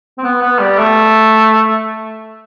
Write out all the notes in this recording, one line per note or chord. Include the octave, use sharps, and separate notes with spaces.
C4
B3
B3
G3
A3